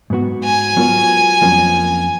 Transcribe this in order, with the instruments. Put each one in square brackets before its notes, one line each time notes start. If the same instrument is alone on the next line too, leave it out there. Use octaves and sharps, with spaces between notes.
[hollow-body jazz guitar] G#2 F#3 B3 F#4
[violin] G#5
[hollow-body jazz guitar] F#3 B3 F4 A#4 C#5
F2 F3 A#3 C#4